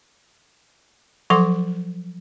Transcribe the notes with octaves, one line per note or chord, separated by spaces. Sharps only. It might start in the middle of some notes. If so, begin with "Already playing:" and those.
F3 F#3 A4 F#5 C6 D6